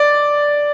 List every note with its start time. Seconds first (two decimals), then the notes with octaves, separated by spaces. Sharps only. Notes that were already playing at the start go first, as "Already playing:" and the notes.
Already playing: D5